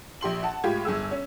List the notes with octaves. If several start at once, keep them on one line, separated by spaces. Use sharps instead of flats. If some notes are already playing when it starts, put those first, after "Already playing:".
A#1 G4 C6 F#7
F#5 A5
A2 G#3 F4 G4 G#6
G1 G#4 E6
C#4